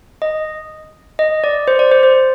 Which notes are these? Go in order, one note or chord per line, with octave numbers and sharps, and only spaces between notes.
D#5
D#5
D5
C5
D5
C5
C5